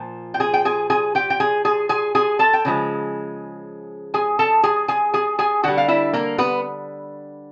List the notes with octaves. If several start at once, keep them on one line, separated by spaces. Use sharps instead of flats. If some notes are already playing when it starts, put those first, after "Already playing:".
Already playing: A#2 F3
G5
G#4 G#5
G5
G#4 G#5
G#4 G#5
G4 G5
G5
G#4 G#5
G#4 G#5
G#4 G#5
G#4 G#5
A4 A5
G5
C#3 F3 G#3
G#4 G#5
A4 A5
G#4 G#5
G#4 G#5
G#4 G#5
G#4 G#5
D3 G3 F#4 F#5
F5
E4 E5
A#3 A#4
B3 B4